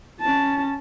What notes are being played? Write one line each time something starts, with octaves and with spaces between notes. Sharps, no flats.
C#4 A5